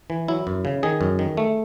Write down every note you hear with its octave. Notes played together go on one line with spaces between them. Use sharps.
E3
F#3 E4
F#2
C#3
D#3 G#4
F#2
D#3
A3